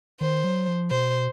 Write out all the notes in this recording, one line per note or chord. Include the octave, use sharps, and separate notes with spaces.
D#3 C5
F#3
F3
B2 C5